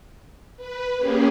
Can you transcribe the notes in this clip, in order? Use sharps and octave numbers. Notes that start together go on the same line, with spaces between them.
B4
A#3 C#4 G4 G#4